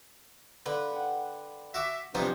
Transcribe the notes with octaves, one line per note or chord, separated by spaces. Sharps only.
D3 B4 F5
F#5 G5
F#4 E5 D6
G2 C3 E3 F3 B3 D#4 C5